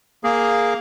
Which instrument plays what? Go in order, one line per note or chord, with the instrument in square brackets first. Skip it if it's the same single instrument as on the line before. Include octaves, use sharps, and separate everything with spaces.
[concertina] A#3 G#4